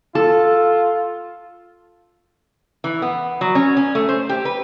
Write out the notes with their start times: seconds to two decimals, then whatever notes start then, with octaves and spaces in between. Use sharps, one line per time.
0.15 F4 A4
2.84 E3
3.02 B3
3.41 F#3
3.55 C#4
3.77 C#4
3.95 A3
4.09 C5
4.29 G4
4.45 B4